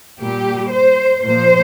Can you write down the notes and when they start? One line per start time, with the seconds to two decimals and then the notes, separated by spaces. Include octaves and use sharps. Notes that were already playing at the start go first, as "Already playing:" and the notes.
0.21 A#2 G3 G4
0.73 C5
1.25 A#2 F3 C5